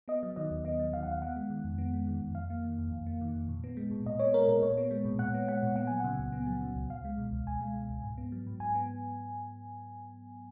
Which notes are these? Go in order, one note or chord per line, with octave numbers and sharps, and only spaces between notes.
B3 D#5
F#3
D#3 D#5
D#2
B3 D#5
F#3
D#3 F5
F#5
D#2 F5
B3 F#5
G#3
D#3
F2
B3
G#3
D#3
F2
F2 F5
A#3
D#3
F2
F2
A#3
D#3
F2
A#2
B3
G#3
A#2
A#2 D#5
B3 C#5
G#3 A#4
A#2 A#4
A#2 C#5
B3
G#3
A#2
A#2 F#5
B3
G#3 F#5
A#2
B3 F#5
F#3 G#5
C#3 F#5
C#2
B3
F#3
C#3
C#2
C#2 F5
G#3
B2
C#2
C#2 G#5
G#3
B2
C#2
G#2
B3
F#3
G#2
G#2 G#5
B3